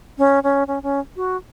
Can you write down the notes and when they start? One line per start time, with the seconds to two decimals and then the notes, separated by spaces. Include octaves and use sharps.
0.18 C#4
0.43 C#4
0.67 C#4
0.83 C#4
1.16 F#4